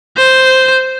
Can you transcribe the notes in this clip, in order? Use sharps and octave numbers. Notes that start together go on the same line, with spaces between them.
C5